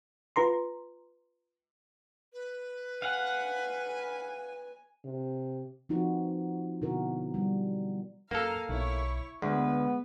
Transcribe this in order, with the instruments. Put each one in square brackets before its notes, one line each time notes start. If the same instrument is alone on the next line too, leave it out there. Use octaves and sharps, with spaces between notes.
[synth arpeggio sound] F4 B4 A#5 C6
[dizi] B4
[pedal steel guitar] F5 F#5 [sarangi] G#5
[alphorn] C3
[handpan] F3 C4 D#4 F4 F#4
B2 D3 E4 F#4 A#4
F#3 G3
[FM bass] F#2 [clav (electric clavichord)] A#3 A4 [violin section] F5 G#5 A#5
[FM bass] B1 [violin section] E4 C#5 C#6
[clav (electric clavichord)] D2 [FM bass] G#3 [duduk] B3 [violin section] B4